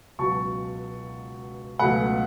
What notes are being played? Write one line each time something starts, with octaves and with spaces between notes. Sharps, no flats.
C#2 B2 F#3 A5 C#6
C#2 B2 F#3 A3 F#5 B5